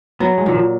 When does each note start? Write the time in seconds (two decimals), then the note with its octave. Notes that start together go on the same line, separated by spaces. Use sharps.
0.20 F#3 B3
0.38 G#3
0.46 A#2 D#3
0.54 F3